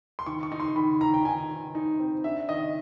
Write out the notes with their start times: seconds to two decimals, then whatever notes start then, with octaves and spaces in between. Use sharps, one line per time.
0.19 C6
0.26 D#3 C#6
0.43 C#6
0.52 D#4
0.60 C6
0.76 D#3 B5
1.01 D#3 A#5
1.13 G5
1.25 D#3 G#5
1.50 D#3
1.75 D#4
1.99 C4
2.24 D4 E5
2.49 D#3 D#5